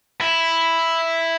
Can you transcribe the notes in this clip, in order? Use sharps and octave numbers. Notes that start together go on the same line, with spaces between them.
E4